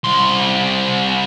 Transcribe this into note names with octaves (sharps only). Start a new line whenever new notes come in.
C2 C6